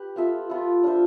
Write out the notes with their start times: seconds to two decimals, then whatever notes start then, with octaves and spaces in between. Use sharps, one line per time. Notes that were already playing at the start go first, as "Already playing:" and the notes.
Already playing: G4 B4
0.16 B3 F4 A4 E5
0.50 B3 F4 A4 E5
0.84 D4 F4 C5 E5